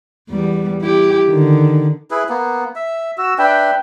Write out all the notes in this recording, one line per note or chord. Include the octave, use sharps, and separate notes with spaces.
E2 G3 B3
E4 G4
D3 D#3
E4 G#4 B4
A#3 B3
E5
F#4 E6
D4 B4 E5 G5